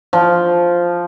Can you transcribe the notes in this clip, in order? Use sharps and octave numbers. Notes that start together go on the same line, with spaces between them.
F3